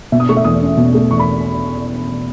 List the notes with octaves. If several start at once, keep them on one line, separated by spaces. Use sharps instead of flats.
B2 E5
D#6
A3 C#6
E5
E2 D#6
C#4
B2
A3
E2 C#6
B5